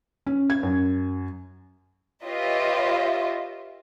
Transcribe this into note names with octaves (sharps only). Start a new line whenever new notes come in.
C#4
G#6
F#2
F4 G4 B4 C#5 D#5 E5